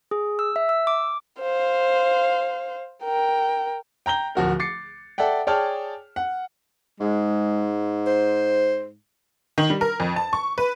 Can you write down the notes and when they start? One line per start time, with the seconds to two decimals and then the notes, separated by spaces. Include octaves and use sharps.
0.11 G#4
0.39 E6
0.56 E5
0.69 E6
0.87 D6
1.40 C5 F5
3.04 A#4 G5
4.06 G5 A#5 G6 G7
4.35 D1 F3 F#4 A#4
4.60 D6 A6 C7 C#7
5.18 A4 D5 E5 F#5 G5
5.47 G#4 C#5 D5 G5 A5 F6
6.16 F#5
7.00 G#2 G#3
8.07 C5
9.58 D#3
9.70 G3
9.81 A#4
10.00 F2
10.16 A5
10.33 C#6
10.58 B4